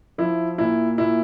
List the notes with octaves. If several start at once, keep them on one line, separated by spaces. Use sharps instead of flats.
F3 E4
A#2 E4
A#2 E4